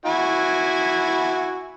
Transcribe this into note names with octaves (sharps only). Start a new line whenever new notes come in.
E4 F#4 G#5